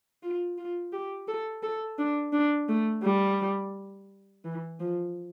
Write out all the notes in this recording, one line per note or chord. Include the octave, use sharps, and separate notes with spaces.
F4
F4
G4
A4
A4
D4
D4
A3
G3
E3
F3